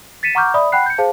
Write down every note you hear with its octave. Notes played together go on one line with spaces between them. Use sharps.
A6 B6 C#7 D#7 E7
F#5 A#5 C#6 D6 F6 G6
D5 E5 B5 D#6
F#5 G5 B5 F#6 C7
G6 C#7
G#4 C5 F5 A5